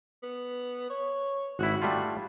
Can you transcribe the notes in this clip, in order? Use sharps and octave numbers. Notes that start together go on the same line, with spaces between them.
B3
C#5
G#1 E4 F#4
G3 A3 F4